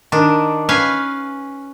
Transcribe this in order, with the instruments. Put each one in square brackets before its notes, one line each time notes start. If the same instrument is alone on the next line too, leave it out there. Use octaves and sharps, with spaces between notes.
[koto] D#3 D4
C#4 B4 F5 G#5